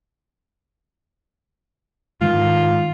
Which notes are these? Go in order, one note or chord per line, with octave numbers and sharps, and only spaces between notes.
G#2 D#3 F4